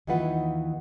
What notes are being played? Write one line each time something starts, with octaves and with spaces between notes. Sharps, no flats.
D#2 E3 D#4 F4 B4 F#5